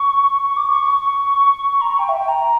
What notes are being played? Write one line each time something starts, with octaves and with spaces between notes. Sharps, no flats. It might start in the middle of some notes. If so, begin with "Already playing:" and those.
Already playing: C#6
C#6
C#6
D6
C#6
C#6
C#6
A#5
C#6
G5
E5
G5
A#5